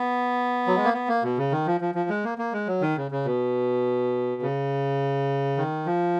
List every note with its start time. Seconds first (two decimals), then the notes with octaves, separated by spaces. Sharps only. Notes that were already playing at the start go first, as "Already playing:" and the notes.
Already playing: B3
0.67 F#3
0.76 G#3
0.85 A#3
0.93 B3
1.08 A#3
1.23 B2
1.38 C#3
1.52 D#3
1.67 F3
1.81 F3
1.95 F3
2.09 G#3
2.24 A#3
2.38 A#3
2.53 G#3
2.67 F#3
2.81 D#3
2.97 C#3
3.11 C#3
3.25 B2
4.42 C#3
5.57 D#3
5.86 F3